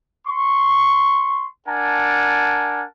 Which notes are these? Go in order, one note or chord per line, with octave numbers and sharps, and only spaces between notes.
C6 C#6
D4 A#4 F#5 G#5 A5